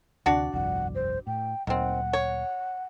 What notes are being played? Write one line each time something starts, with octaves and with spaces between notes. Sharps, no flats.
D2 C3 D4 F#4 D5
G1 C2 F2 F#5
C5
A2 G5
D2 A#2 D#3 F#3 C4 F#5
C#5